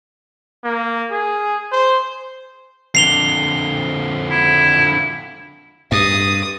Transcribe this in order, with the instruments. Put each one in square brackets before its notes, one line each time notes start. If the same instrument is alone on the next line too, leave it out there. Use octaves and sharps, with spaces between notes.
[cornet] A#3
G#4
C5
[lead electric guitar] F2 D3 [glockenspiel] C7 F7 G7
[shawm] E4
[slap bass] G2 [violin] D#6